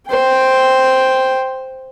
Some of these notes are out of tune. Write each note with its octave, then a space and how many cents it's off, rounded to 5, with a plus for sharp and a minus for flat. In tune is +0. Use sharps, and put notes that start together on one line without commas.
C5 +0 G5 +0